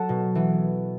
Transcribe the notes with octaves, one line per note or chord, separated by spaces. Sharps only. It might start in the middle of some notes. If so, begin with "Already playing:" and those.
Already playing: F#3 A4 F#5 A5
B2
E3